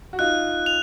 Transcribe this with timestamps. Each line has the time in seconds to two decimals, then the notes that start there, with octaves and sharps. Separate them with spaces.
0.13 F#4
0.19 D#4 F4 F#6
0.66 F7